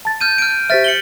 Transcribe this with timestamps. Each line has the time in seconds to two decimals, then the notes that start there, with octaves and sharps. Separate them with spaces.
0.05 A5 A6
0.21 F6 G6 D#7
0.38 F6 D7
0.70 G4 C5 E5 F6 A6 B6
0.84 C#7 F#7 G7